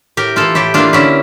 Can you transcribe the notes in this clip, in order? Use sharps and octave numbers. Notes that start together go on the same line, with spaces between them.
A2 G4 A#4
E3 A#3 F4 A4
A2 E4 G4
E3 A#3 D4 F4
D3 C#4 E4